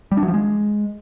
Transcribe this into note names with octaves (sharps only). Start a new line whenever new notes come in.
G3
D4
F#3
F3
G#3